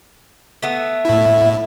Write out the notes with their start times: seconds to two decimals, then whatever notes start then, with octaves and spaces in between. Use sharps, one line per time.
0.62 A3 B3 E5
1.05 A2 E4